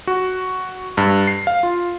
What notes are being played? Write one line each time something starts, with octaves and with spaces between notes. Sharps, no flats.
F#4
G2
C7
F5
F4